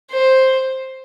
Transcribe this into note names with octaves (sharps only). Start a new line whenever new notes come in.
C5